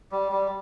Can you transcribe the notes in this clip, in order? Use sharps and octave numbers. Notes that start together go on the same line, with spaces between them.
G3
G3